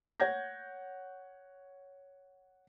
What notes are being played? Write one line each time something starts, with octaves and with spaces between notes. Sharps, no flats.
C#5 F#5 G6 G#6 A#6